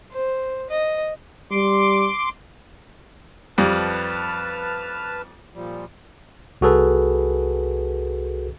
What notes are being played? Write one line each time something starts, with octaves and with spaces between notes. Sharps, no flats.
C5
D#5
G3 C6 D6
F2 G3 B4 A5 F6
A#2 F3 G3
C2 F#4 G#4 A4 B4